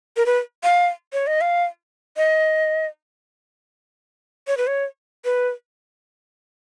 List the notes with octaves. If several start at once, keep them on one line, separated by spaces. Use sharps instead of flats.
A#4
B4
F5
C#5
D#5
F5
D#5
C#5
B4
C#5
B4